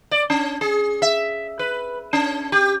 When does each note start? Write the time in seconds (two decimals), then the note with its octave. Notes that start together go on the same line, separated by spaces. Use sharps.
0.11 D5
0.30 C#4
0.61 G#4
1.02 E5
1.59 B4
2.13 C#4
2.52 G4